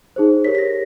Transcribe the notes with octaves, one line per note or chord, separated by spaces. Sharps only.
D#4 G#4 C5
G4 A#4 C#5 B6
B6
A#6